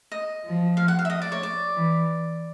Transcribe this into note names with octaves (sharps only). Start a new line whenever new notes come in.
D#5
F3
F5
F#5
F5
E5
D#5
D5
C#5
D5
E3